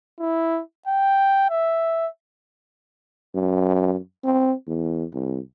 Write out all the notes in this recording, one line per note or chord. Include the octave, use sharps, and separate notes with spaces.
E4
G5
E5
F#2
C4
E2
C2